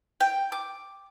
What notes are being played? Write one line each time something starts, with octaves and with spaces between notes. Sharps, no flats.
G5
D6